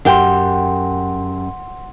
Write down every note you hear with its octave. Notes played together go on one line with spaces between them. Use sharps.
F#2 G4 F#5 G5 C6